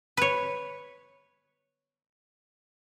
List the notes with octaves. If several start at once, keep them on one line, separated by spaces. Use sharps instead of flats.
B4 C#5